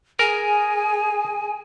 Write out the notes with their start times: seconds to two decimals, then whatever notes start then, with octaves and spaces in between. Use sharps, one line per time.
0.19 G#4 A#4 G#5